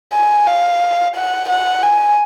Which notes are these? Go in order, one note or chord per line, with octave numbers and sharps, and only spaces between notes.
G#5
F5
F#5
F#5
G#5